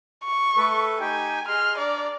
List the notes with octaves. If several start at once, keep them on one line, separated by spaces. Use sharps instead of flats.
C#6
A3 A4 B4
D#4 G4 G5 G#5
G#4 D#5 C6 F6
D4 D5 A#5